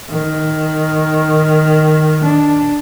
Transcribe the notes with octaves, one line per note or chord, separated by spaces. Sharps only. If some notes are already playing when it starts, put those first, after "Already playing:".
D#3
D4